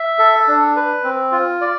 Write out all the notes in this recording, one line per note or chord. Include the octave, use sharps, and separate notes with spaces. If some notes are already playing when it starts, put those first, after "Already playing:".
Already playing: E5
A4
D4
B4
C4
F4
D5